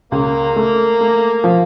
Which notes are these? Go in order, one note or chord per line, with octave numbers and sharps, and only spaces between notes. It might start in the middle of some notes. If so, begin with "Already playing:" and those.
C#2 A#3
A3
A3
F3